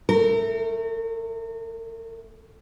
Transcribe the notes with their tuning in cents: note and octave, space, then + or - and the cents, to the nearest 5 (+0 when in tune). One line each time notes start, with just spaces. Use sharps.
A3 +0 A#4 -40